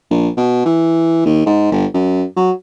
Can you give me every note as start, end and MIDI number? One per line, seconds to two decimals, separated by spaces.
0.11 0.29 34
0.37 0.61 47
0.65 1.23 52
1.25 1.44 39
1.46 1.68 44
1.72 1.86 31
1.94 2.24 42
2.37 2.51 54